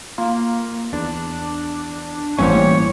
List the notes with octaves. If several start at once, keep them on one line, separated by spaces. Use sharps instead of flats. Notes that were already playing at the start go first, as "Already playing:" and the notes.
A#3 F4
E2 D4
A1 G2 A#2 E3 G3 C#4 C5 C#5